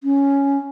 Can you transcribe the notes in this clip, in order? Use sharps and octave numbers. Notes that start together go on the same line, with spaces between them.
C#4